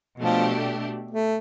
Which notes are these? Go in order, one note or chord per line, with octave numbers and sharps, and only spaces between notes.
B2 F3 A3 D4 G4
A3